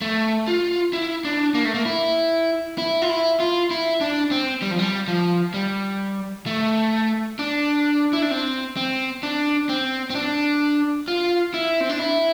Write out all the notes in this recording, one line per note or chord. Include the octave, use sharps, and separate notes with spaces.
A3
F4
E4
D4
A#3
A3
A#3
E4
E4
F4
E4
F4
E4
D4
C4
G3
F3
G3
F3
G3
A3
D4
E4
D4
C4
C4
D4
C4
C4
D4
F4
E4
C4
D4
E4